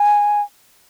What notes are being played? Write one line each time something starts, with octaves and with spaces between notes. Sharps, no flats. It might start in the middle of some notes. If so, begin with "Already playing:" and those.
Already playing: G#5